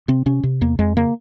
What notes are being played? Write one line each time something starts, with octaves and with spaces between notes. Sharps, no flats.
C3 C4
C3 C#4
C3
E2 A#3
F2 G#3
C#3 A#3